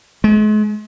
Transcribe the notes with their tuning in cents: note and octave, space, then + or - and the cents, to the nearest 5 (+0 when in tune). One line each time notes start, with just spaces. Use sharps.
G#3 +40